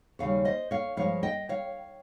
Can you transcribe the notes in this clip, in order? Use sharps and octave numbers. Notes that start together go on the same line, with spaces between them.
D#2 C#3 G3 C#5 F5
C5 D#5
C#5 F5
G2 F3 G#3 C#5 F5
D#5 G5
C#5 F5